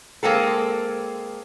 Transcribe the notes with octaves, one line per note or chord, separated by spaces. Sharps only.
G#3 A#3 C4 A4